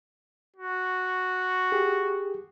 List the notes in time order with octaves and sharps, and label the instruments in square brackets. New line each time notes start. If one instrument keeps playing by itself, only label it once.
[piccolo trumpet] F#4
[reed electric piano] G4 G#4